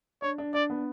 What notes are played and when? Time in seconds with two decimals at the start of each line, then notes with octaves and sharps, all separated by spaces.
0.22 D4 C#5
0.38 D4
0.54 D4 D5
0.70 B3